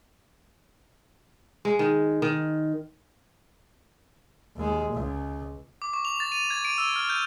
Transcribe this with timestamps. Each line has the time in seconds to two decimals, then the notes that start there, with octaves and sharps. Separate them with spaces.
1.65 G#3
1.79 D#3
2.22 D#3
4.56 D#2 G#3
4.93 C#2
5.82 D6
5.93 C#6
6.05 F7
6.20 A6
6.32 D#7
6.50 G#6
6.65 D7
6.78 E6
6.96 F6
7.09 G6